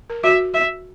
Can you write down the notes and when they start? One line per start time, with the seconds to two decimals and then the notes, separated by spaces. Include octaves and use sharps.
0.10 A#4
0.24 F#4 E5
0.54 E5